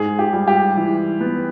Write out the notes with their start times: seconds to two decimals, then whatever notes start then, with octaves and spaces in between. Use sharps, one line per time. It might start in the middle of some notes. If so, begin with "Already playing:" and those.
Already playing: G#2 G#4
0.19 G4
0.33 G3
0.48 G4
0.77 E3
1.21 B3